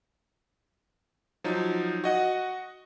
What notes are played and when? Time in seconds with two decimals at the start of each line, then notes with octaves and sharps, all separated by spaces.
1.44 F3 F#3 D#4
2.04 F#4 D#5 F#5